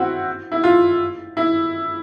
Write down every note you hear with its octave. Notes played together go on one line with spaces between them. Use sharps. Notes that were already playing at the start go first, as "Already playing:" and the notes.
Already playing: C4 E4 F#4
E4
F4
E4